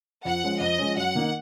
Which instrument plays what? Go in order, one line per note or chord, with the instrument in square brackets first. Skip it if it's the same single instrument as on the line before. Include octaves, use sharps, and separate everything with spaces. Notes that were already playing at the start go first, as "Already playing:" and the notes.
[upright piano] F2 [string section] F#5
[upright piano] F3 G#3 C#4
[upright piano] F2 [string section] D#5
[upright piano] F3 G#3 C#4
[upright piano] F#2 [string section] F#5
[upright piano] D#3 A#3 D#4